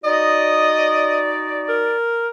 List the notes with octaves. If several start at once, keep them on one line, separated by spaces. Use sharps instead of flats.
D#4 F#4 D5 D#5
A#4